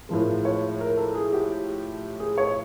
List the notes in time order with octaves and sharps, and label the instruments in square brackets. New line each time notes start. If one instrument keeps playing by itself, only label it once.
[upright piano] A2 F3 G#3 A#4
C#5
A#4
A4
G#4
G4
G#4
C#5